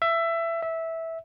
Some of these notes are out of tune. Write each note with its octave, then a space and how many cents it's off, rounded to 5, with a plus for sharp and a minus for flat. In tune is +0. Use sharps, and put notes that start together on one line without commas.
E5 +15
E5 -15